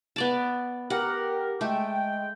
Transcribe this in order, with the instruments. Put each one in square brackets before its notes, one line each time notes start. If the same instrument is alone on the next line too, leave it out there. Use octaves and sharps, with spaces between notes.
[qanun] B3 D5 A5
[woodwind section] G4 A#4 [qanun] F#5
[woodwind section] G#3 G5 [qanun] A3